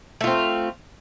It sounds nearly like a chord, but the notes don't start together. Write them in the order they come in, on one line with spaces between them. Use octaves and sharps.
A3 F4 C4